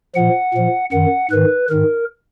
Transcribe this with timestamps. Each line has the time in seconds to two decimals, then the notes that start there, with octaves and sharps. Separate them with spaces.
0.15 A#2 F3 F#5
0.54 A#2 F3
0.92 F#2 D#3 F#5
1.31 G#2 D#3 B4
1.70 G#2 D#3 A#4